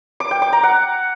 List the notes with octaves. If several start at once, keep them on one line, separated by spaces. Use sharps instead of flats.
D6
G5
D6
A#5
F#5